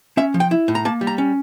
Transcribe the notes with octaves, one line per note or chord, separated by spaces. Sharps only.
C#4 E5
F3
G5
E4
A2
A#5
A#3 A5
G3
A#5
C#4